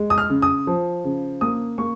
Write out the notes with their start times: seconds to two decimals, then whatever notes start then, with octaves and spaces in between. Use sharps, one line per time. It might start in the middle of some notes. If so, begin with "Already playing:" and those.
Already playing: G#3
0.10 D#6
0.18 F6
0.30 C#3
0.42 D#6
0.67 F3
1.04 C#3
1.41 A#3 D#6
1.78 A#3 C#6